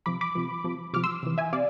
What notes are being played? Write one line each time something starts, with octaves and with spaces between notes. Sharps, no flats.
C3 F3 B5 D6
B5 D6
C3 F3
C3 F3
C3 F3 D6 F6
C6 E6
C3 E3
E5 G#5
C3 D5 F5